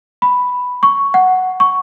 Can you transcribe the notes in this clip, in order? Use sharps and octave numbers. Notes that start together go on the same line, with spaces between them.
B5
C#6
F#5
C#6